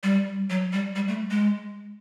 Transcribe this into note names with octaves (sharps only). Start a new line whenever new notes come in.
G3
F#3
G3
G3
A3
G#3